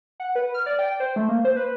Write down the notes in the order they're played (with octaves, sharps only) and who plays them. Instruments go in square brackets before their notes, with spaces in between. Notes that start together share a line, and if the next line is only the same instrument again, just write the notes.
[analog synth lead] F#5
B4
F6
D5
G5
C5
A3
A#3
C5
B4